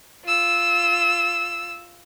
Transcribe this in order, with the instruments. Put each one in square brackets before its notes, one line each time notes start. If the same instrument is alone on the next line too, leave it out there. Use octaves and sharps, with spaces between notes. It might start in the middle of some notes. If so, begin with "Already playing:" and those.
[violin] F4 E6